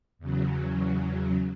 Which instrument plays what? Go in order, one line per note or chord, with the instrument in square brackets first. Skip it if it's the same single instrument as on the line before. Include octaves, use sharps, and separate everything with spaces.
[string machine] E2 C#3 F#3